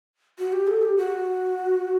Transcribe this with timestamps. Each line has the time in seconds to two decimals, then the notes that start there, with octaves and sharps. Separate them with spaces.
0.39 F#4
0.53 G4
0.67 A4
0.82 G4
0.97 F#4